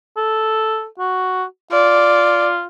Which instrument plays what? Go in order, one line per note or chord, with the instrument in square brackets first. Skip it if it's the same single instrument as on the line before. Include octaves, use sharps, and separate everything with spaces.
[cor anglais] A4
F#4
[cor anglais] F4 [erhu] D5